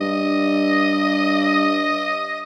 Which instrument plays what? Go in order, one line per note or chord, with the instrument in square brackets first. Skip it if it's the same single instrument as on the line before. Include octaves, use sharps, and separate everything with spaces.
[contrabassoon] G2 [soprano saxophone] D#5